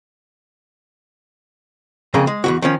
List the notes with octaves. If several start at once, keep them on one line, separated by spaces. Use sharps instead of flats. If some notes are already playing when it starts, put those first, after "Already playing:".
F2 C#3 A#3 G#4 A#5
G#3
E2 G#2 F#4
D#3 F3 C#4